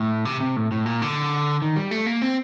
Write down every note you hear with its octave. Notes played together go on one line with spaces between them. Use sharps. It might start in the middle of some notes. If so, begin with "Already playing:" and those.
Already playing: A2
C3
C3
A2
A2
A#2
D3
D#3
G3
A3
A#3
C4